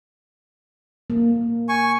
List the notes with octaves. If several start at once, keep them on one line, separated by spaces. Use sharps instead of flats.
A#3
G#5 C#6